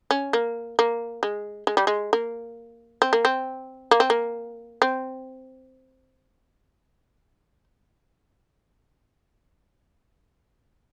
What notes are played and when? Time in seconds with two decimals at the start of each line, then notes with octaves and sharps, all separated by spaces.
0.11 C#4
0.33 A#3
0.79 A#3
1.23 G#3
1.67 G#3
1.77 G3
1.87 G#3
2.13 A#3
3.02 C4
3.13 A#3
3.25 C4
3.91 A#3
4.00 C4
4.10 A#3
4.82 C4